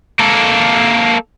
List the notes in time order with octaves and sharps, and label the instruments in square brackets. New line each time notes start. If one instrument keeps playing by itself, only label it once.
[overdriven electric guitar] A#3 A4